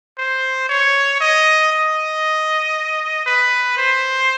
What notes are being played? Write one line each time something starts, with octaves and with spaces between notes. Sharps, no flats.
C5
C#5
D#5
D#5
B4
C5